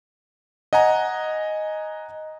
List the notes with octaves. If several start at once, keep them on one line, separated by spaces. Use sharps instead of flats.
D#5 F#5 G#5 A#5